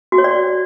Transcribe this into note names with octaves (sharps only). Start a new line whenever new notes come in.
F#4
C#5
D5